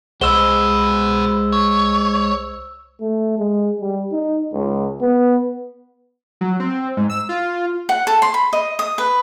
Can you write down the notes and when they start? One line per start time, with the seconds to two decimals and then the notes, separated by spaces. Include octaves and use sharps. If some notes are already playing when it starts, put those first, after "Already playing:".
0.21 C2 G#3 F#4 B4 C5 E6 E7 G7
1.52 C#5
3.00 A3
3.38 G#3
3.80 G3
4.12 D#4
4.53 C#2
5.01 B3
6.41 F#3
6.60 C4
6.97 G#2
7.10 E6
7.29 F4
7.89 F#5
8.07 A4
8.22 C6
8.34 B5
8.53 D#5
8.79 D#6
8.98 B4